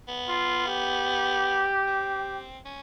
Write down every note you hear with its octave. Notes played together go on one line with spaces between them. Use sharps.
B3
F4
G4
C4
C#4